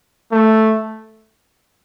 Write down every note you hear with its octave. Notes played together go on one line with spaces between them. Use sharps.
A3